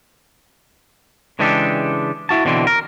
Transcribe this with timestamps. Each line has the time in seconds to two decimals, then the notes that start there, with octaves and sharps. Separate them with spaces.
1.39 C#3 E3 G#3 D4 G4 A4
2.29 E4 F#4 A5
2.45 B2 D3 E3 C4
2.67 A#4